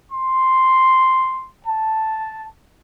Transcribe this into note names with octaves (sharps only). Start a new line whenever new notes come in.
C6
A5